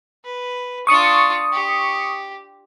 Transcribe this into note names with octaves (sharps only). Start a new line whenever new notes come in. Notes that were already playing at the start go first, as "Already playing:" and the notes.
B4
D4 F4 C#6 D#6 C#7
G4